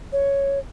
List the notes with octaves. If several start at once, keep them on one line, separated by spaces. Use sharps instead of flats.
C#5